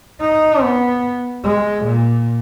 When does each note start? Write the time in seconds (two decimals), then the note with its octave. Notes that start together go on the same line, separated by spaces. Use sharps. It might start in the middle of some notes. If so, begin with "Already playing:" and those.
0.21 D#4
0.62 B3
1.44 G#3
1.85 A#2